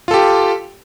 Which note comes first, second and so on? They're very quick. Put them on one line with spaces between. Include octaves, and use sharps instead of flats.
F4 A4 G4